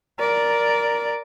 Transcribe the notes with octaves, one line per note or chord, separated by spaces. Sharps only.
A#4 D5